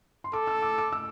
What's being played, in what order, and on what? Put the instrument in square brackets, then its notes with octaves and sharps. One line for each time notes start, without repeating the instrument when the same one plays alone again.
[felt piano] C6
[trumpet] A4 [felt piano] D6
[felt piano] E6
D6
D6
E6